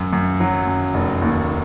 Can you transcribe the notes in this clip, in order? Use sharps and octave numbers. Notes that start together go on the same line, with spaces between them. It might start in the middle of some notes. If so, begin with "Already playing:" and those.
Already playing: F#2
F#2
F#3
F#2
F1
D#2